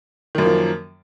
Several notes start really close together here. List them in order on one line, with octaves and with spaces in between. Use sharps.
D#3 F#2 A#3 F3